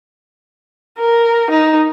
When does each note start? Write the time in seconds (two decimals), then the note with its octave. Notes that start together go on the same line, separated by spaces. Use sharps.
0.99 A#4
1.51 D#4